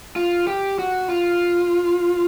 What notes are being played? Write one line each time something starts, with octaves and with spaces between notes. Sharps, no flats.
F4
G4
F#4
F4